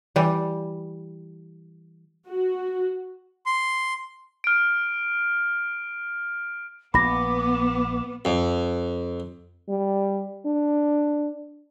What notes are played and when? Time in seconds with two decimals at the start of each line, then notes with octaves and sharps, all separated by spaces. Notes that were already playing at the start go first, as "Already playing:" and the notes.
0.16 E3 G3
2.27 F#4
3.46 C6
4.44 F6 D7
6.94 A#1 B3 B5 D6 A#6
8.25 F2
9.69 G3
10.46 D4